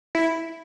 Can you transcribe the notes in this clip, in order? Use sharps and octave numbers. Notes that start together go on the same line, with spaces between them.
E4